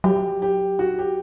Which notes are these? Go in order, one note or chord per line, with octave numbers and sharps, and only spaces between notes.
F#3 G4
G4
F#4
G4